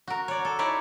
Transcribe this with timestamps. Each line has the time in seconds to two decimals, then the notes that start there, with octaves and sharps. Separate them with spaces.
0.08 F#4 A#4
0.28 C#5 D5
0.45 A4
0.59 D#4 E4 C#5 D5